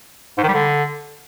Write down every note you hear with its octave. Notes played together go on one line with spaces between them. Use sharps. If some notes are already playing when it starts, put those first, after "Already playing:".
G#2
D#3
G3
D3